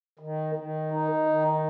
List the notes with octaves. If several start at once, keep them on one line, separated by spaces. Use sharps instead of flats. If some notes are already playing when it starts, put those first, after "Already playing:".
D#3
D#3
D#4
D#3